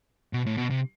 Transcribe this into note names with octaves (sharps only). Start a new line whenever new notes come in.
B2
A2
B2
C3